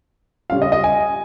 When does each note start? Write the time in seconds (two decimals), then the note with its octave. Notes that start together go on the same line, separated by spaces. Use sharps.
0.50 C#3 G3 C#4 F4 F5
0.62 D#5
0.72 D#5
0.84 G#5